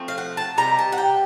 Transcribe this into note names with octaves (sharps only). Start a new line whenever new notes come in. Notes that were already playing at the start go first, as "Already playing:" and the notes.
Already playing: F3 A3 C4
F5
F#5
A5
C3 D#3 G3 A#5
A5
F#5
G5